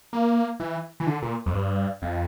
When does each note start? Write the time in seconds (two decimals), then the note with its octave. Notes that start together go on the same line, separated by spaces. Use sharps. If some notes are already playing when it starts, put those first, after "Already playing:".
0.13 A#3
0.60 E3
1.00 E3
1.07 D3
1.22 A#2
1.46 F2
1.53 G2
2.02 F2